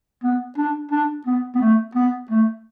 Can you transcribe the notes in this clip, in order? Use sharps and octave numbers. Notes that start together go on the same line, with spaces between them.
B3
D4
D4
B3
B3
A3
B3
A3